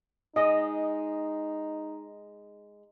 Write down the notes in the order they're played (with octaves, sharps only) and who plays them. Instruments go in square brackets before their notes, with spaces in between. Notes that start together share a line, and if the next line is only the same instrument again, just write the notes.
[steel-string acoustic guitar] G#3 [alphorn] D#4 [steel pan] D#5